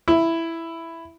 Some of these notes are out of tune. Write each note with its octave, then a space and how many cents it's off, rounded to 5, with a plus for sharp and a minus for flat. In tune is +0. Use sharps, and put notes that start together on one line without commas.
E4 +5